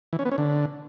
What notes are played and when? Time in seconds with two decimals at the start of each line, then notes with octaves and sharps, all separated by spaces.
0.13 E3
0.19 C#4
0.25 B3
0.32 C#4
0.38 D3